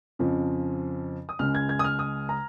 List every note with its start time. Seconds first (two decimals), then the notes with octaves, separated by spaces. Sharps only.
0.19 F2 C#3 F3
1.29 D#6
1.39 C#2 C#3 G#3 F6
1.55 G#6
1.69 G#6
1.79 D#6
1.84 F6
1.99 D#6
2.29 A#5